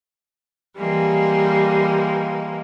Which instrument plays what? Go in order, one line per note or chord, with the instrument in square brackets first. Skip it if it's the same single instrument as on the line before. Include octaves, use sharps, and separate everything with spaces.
[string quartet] E3 G3 G#3 A#3